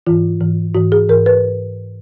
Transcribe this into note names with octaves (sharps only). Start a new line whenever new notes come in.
G#2 E3 F4
G#2 E3
G#2 E3 F#4
G#4
G#2 E3 A#4
B4